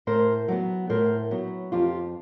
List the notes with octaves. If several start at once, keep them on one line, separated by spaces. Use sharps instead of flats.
A2 A#4 C5
F#3 B3
A2 A#4 C5
F#3 B3
F2 F4 G4